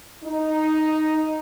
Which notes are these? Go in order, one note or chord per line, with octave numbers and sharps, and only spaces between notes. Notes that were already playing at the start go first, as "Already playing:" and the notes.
D#4